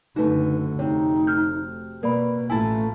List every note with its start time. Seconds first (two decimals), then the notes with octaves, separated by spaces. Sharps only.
0.16 F#1 D3 A3 D#4 F#4 B4
0.79 F1 C3 D#4 C#5
1.27 F6 G6
2.03 B2 A#3 A#4 B4 D5 B5
2.50 A1 A3 E4 F4 G#5 A5